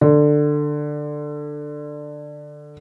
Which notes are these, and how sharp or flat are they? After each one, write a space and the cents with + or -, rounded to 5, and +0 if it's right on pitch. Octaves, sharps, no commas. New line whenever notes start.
D3 +15